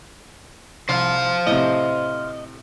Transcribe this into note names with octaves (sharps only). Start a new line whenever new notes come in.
C2 C5 F5
A2 C3 D#5